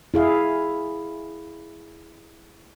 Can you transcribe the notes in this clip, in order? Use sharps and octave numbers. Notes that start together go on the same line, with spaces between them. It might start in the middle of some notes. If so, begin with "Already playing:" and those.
E4 G#4 F5